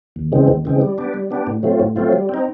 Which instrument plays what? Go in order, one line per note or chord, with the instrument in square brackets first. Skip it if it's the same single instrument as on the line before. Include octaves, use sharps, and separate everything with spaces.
[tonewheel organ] D#2
C#3 E3 G#3 C4
D#2
C#3 E3 G#3 C4
G3
B3 D4 G4
G3
B3 D4 G4
A2
F#3 A3 C4 F4
A2
F#3 A3 C4 F4
G3
C4 D#4